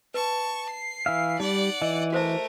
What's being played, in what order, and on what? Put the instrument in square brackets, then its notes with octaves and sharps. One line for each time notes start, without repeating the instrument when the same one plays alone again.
[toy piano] B4 [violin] A5 C#6
[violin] C7
[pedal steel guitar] E3 E5 F5
[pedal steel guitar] G3 [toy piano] D#4 [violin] D5 F#5
[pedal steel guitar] E3 [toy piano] D#5
[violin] A3 A#4 [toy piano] F#4 C5 E5